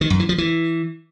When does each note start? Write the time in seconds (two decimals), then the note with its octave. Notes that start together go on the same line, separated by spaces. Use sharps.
0.01 D#3
0.10 F#2
0.20 E3
0.29 F3
0.38 E3